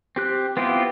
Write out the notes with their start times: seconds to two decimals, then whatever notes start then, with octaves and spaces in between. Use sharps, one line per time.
0.16 C4 G4 F#6
0.57 B3 C4 E4 F4 G4